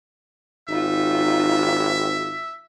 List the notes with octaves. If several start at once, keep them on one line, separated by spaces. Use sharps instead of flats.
G#1 D#4 F4 E5